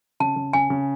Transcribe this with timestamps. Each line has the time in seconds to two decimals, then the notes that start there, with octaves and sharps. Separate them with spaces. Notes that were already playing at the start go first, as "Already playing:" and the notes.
0.20 C#3 A5
0.36 C#3
0.53 C#3 G#5
0.70 C#3